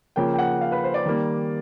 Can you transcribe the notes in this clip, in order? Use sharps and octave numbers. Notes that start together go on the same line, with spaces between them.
C#3 F3 A#3 G5
G5
F#5
F5
B4
C5
D5
D#3 G3 A#3